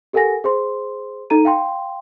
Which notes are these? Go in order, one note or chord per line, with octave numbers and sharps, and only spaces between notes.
G4 A4 A#4 F#5 G#5 A#6
G#4 C5 C6
D#4 A4 A#5 D#7
F5 G5 C6